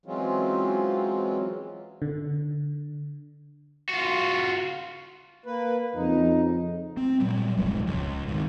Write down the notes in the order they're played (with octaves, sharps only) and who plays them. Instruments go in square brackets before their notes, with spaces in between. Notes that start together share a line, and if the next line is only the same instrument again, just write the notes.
[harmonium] E3 F#3 G#3 C4 C#4 F4
[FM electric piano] D3
[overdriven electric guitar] F4 F#4
[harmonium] A#3 B4
[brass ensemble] F2 C#3 [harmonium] D#4
[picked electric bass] C4
A#2 F#3 G3
D1 B1 F2 G#2
C#2
G#2 D#3